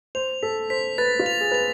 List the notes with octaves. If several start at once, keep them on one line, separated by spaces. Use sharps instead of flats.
C5 F7
A4 B6
C5 B6
B4 A6
F4
F7
G#4
B4 F7